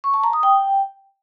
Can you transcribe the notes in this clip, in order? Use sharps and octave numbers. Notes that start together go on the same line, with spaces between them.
C#6
A5
A#5
D#6
G5